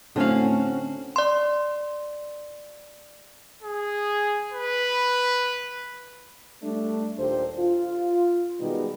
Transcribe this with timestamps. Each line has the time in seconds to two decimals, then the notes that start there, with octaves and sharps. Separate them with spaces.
0.16 A2 D3 C4 C#4 F#4 F5
1.16 D5 C6
3.62 G#4
4.52 B4
6.62 G3 A3 D4
7.18 D#2 A#2 D4 G4 A4 C5
7.59 F4
8.60 B2 D#3 G3 G#3 D#4 B4